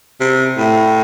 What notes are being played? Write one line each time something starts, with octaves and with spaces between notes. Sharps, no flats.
C3
A2